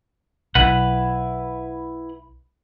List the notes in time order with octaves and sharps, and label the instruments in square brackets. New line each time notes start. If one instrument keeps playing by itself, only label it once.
[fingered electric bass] B1 [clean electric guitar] E4 B4 F#5